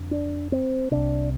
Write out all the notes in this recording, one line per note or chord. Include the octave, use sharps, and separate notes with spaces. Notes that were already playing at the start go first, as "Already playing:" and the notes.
Already playing: F2 D3
D4
C4
C2 C3 D4